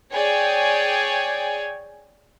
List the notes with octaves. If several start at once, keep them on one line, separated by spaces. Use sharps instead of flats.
G#4 C#5 D5 G5 G#5